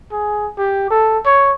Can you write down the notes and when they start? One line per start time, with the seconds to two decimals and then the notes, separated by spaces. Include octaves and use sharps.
0.11 G#4
0.58 G4
0.90 A4
1.25 C#5